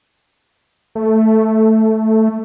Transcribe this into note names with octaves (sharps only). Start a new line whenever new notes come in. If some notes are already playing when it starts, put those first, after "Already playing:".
A3